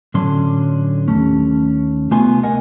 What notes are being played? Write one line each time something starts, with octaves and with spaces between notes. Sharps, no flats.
A2 D3 F#3 C#4 D4 C6
D#2 A3 C#4
C2 A3 B3 F4 G#5 C6
A#4 D#5 F#5 G#5